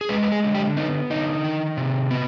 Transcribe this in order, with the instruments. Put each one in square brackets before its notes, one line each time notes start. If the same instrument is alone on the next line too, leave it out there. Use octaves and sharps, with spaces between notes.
[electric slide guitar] G#4
G#3 B4
B4
G#4
D3
G4
B3 D#4
D3 D#4
D#3
C3
B3